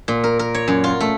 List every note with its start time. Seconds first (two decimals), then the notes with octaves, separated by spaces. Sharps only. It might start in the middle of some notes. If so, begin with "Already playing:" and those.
0.08 A#2
0.24 A#4
0.39 A#4
0.54 C#5
0.68 F#2
0.84 F4
1.00 A3